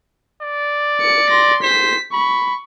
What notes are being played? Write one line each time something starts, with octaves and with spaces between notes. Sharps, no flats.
D5
C#7
C6 A#6
C5 B6
B5 C#6